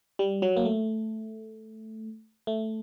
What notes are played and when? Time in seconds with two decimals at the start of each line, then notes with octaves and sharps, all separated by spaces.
0.19 G3
0.42 F#3
0.57 A#3
0.65 A3
2.47 A3